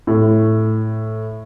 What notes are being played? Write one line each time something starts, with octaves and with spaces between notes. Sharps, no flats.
A2